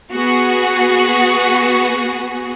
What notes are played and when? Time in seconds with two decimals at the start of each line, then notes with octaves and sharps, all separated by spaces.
0.12 B3 F#4 G#4